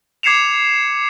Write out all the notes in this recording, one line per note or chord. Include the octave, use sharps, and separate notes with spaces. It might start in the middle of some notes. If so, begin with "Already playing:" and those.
D6 G#6 C7 C#7 E7 F7